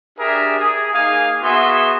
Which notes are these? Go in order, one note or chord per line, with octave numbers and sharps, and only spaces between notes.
D4 G4 G#4 A#4 E5
G#4
A#3 D#4 G#4 F5 G#5
B3 F#4 G#4 E5 C6